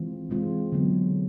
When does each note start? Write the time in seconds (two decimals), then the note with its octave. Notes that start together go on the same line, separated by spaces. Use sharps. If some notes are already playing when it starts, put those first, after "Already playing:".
Already playing: E3 G#3 C4 F4
0.30 E3 G#3 C4 F4
0.72 D3 F#3 B3